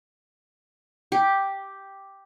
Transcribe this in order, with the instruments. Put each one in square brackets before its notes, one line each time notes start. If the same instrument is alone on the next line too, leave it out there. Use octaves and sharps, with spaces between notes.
[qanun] G4